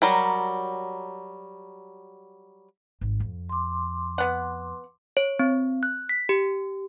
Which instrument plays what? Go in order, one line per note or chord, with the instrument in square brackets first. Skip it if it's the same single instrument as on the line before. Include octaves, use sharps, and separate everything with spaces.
[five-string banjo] F#3 G3 A#4
[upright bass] G#1
F2
[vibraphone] C6 D6
[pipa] B3 F#5
[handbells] C#5
C4
F#6
B6
G4